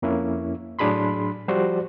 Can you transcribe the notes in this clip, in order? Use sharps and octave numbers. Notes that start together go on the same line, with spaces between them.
F2 A#3 C#4 E4
A2 F#3 D4 G#4 B5 C6
F3 G3 F#4 C5 D5